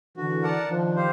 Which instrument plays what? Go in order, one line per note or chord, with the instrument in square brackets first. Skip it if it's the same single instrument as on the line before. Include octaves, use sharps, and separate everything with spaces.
[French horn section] D3 E3 [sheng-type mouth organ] F#4
[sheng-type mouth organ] A#4 D5 F#5 A5
[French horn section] D#3 F3 [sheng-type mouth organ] D4
[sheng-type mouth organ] G4 C5 F5